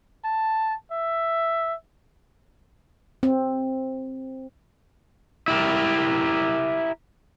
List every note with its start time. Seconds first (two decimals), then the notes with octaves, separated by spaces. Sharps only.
0.25 A5
0.91 E5
3.23 C4
5.48 E4 G4 A#4